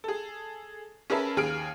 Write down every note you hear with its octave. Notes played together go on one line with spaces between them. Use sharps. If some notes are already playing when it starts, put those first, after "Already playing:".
G#4 A4
C#4 G#4 A#4 B4 E5 A5
D#2 G#4 F6 D7